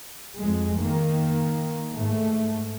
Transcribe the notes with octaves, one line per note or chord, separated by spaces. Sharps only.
F2 G#3
D#3 A#3
G#2 A3